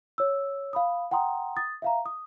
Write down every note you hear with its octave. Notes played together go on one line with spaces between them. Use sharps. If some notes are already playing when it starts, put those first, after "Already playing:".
C#5 E6
F5 B5 D#6
F#5 G5 A#5 C6 D#6
D#6 A6
E5 F5 A#5
D#6